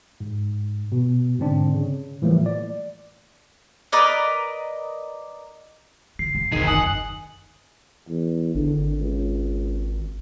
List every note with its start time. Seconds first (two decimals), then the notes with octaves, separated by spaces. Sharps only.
0.20 G#2
0.92 B2
1.39 G#2 D3 C4 D4
1.75 C#3
2.22 A2 E3 F3 G3 A3 A#3
2.46 D5
3.92 A#4 B4 D5 D#5
6.19 D3 C7
6.35 A#3
6.52 D#2 C3 D#3 C4 G#4
6.67 G1 F#2 F#5 G#5 D#6
8.09 E2
8.55 G#1 D3
9.00 C#2